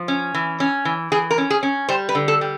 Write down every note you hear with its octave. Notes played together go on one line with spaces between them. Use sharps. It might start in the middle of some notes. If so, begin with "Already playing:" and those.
Already playing: F3
C#4
E3
C#4
E3
E3 G#4
A#4
C#4
G#4
C#4
G3 C5
B4
D3
A4
G3